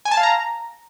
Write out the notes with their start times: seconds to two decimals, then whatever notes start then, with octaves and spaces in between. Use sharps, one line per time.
0.05 G#5
0.11 A5
0.17 F5
0.23 A#5